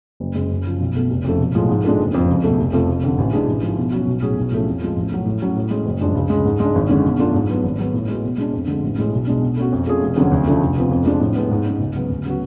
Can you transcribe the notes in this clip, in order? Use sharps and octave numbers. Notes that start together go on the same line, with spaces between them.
F#1
F#2 C#3 G#3
F#2
C#3 F3
B1
B2 A3
F1
F2 C#3 F3 A3
B1
A2 F3 G#3
G#2
G#3 D4 F4 A4
F#1
F2 F3
C#2
B2 A3
F1
F2 F3 A3
F1
F2 D3
A1
A2 G#3 D4 G#4
A1
G#2 F3
B2
F#3 C#4 F#4
B1
A2 F#3 C#4 G#4
B1
A2 F3 A3 C#4
F2
F3 G#3
A1
A2 F#3
A2
F#3 C#4 F#4
A2
G#3 C#4
F#1
F#2 F3 G#3 D4
C#2
C#3 G#3
G#2
G#3 D4
G#1
F#2 D3 G#3 C#4
B2
F#3 A3 D4 F4
G#2
F#3 B3
G#1
G#2 F#3 B3
A2
G#3 B3 F#4
B2
G#3 D4
F2
D3 G#3
A1
A2 G#3
B1
B2 G#3 D4
B2
A3 C#4 F#4
F2
F3 A3 C#4 G#4
F1
F2 D3 F#3 C#4
D2
C#3 F3 A3 D4
F1
F2 F3 B3
F2
F3 G#3 D4
A2
G#3 B3
G#2
G#3 C#4
C#2
C#3 F#3 B3
D2
C#3 F#3 B3 F#4